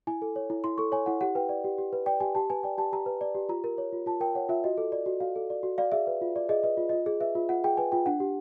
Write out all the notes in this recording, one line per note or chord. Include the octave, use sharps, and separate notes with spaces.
E4 G#5
A4
C#5
E4
E4 C6
A4 C#6
C#5 G#5
E4 F#5
G4 F#5
B4 G5
D5
G4
G4
B4
D5 G5
G4 G#5
G4 A5
B4 G#5
D5 G5
G4 A5
G4 A#5
B4
D5
G4
F4 A#5
A#4
C#5
F4
F4 A5
A#4 G5
C#5 F#5
F4 E5
F#4 D#5
A4
D5
F#4
F#4 F5
A4
D5
F#4
D5 F5
G#4 E5
B4
F4
D5
G#4 D#5
B4 D#5
F4
F4 D#5
G#4
B4 E5
F4
F4 F#5
G#4 G5
B4 G#5
F4 G5
D4 F#5
G4